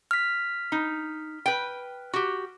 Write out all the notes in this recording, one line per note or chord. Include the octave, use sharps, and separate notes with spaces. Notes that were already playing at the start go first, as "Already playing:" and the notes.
F6 B6
D#4
B4 G5
F#4 G4